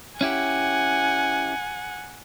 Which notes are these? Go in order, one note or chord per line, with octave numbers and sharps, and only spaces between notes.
C#4 E4 G4 F#5 G#5